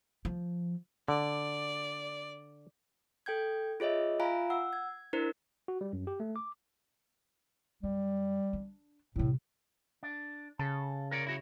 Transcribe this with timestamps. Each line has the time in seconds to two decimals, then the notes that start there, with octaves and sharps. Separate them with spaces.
0.25 F3
1.08 D3 D5
3.26 A4 G5 G6 G#6
3.80 F4 G#4 C#5 D#5 E5
4.20 F4 E5 F5 G#5 A#5 B5
4.50 F#5 E6
4.73 G#6
5.13 D4 E4 A#4 C5
5.68 F#4
5.81 G3
5.93 F#2
6.07 G4
6.20 A3
6.36 D6
7.83 F#2 G3
8.53 D4
9.16 A2 C3 G3
10.03 D4
10.59 C#3 A4
11.11 A#4 C#5 D5
11.27 E4 F#4 C#5